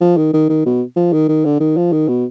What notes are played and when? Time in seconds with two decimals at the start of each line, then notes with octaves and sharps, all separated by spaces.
0.01 F3
0.17 D#3
0.33 D#3
0.49 D#3
0.65 B2
0.96 F3
1.13 D#3
1.29 D#3
1.45 D3
1.60 D#3
1.77 F3
1.92 D#3
2.08 B2